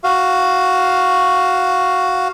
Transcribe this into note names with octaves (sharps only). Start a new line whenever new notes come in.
F#4 F5